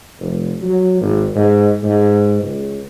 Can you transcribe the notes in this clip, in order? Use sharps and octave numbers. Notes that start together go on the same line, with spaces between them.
F1
F#3
G#1
G#2
G#2
C#2